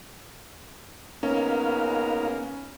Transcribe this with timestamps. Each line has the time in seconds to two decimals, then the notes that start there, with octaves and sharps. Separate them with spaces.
1.23 C#2 A#3 B3 C#4 D#4 A#4 F5